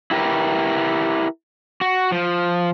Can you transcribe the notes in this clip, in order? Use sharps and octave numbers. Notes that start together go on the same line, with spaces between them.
E4 G4 A#4 B4
F#4
F3